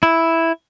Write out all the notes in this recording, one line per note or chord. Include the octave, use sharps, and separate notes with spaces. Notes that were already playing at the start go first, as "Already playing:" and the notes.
E4